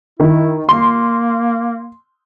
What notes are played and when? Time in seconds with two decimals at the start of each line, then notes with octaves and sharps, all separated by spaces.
0.20 D#3 E4
0.69 A#3 C6